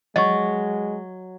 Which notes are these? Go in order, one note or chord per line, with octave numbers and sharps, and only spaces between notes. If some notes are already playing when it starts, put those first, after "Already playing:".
F#3 G#3 D#5 C#6